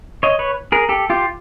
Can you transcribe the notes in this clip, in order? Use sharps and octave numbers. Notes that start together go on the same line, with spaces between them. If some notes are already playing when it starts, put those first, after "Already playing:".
C#5 D#5
B4 C#5
G#4 A#4
G4 A4
F4 G4